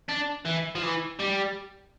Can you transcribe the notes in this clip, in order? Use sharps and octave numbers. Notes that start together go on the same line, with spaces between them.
D4
E3
F3
E3
G3